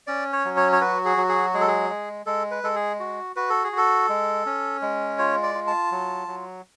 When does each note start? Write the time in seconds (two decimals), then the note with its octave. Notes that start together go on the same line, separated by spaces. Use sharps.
0.07 C#4 D5
0.33 C#5
0.45 F#3
0.57 C#5
0.72 C#5
0.81 F#4 B4
1.05 G#4
1.17 F#3
1.29 G#4
1.54 G#3 G#4
1.61 A4
1.68 G#4
1.90 G#3
2.26 G#3 A4
2.51 B4
2.64 G#3 A4
2.76 G#4
3.00 F#4
3.36 F#4 B4
3.50 A4
3.64 G#4
3.72 F#4
3.77 A4
4.09 G#3
4.46 C#4
4.82 G#3
5.18 F4 C#5
5.43 D5
5.55 F4
5.67 A5
5.92 F#3
6.28 F#3